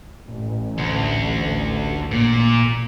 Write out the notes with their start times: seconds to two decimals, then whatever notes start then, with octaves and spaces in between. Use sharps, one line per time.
0.27 A1
0.78 D2
2.11 A#2